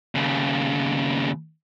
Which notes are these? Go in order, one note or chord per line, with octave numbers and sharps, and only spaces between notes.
D#2 C#3